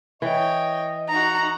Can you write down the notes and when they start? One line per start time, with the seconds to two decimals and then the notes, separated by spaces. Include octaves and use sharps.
0.22 E3 C#5 D#5 G5
1.09 D#4 F#4 A#5